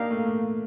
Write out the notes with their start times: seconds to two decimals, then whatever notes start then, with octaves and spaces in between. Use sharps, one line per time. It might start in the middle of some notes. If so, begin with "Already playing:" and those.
Already playing: A#3 D4 D#4 G4 A#4 F5
0.11 A3
0.25 A3